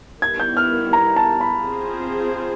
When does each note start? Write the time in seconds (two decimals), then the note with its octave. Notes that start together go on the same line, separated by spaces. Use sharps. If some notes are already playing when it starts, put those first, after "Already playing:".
0.22 D#3 G3 B3 E4 G#6
0.40 G6
0.57 F6
0.93 A#5
1.16 A5
1.41 B5
1.64 C4 F4 G#4 C5